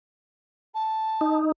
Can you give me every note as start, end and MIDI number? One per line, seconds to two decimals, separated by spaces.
0.74 1.38 81
1.21 1.52 63